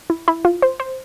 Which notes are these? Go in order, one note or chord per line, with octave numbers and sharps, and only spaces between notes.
E4
E4
F4
C5
C5